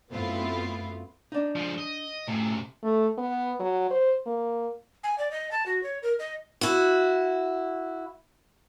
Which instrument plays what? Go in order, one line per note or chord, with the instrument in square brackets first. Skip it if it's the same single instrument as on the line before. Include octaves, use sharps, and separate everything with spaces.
[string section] F#2 A3 B3 C4 E4 F4
[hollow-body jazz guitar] D4 D#4
[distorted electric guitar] F3 G#3
D#5
[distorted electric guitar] F#2 C3 [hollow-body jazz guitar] A2
[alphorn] A3
B3
F#3
C5
A#3
[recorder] G#5
D5
D#5
A5
F#4
C#5
A#4
D#5
[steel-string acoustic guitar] E4 F#4